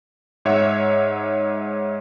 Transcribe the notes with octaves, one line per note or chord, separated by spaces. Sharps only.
G#2 C#5 E5 F#5